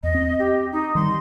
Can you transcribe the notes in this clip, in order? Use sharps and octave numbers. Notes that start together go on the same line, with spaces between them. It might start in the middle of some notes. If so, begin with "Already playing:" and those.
E2 D#5
C4
G4
D#4
D#3 G3 C6